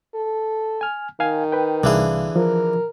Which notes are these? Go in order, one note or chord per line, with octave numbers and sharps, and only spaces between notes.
A4
G#5 F6
D#3 F5 G#5
B4 G5
C2 D3 E3 G#4 F5
F3 A#4